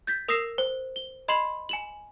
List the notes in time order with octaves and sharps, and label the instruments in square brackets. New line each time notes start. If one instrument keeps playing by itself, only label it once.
[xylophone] G6 A6 B6
A#4 D#6 E6 A#6 C7 E7
C5
G7
D#5 B5 C6 C7 E7 F#7
G#5 E7 F#7